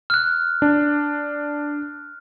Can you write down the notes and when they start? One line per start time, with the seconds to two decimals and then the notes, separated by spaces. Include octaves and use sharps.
0.10 F6 F#6
0.62 D4